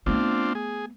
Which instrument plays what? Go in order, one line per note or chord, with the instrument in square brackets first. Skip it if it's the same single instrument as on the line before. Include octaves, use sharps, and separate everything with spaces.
[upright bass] A3 B3 [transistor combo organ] C4 D4 F4
[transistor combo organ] G#4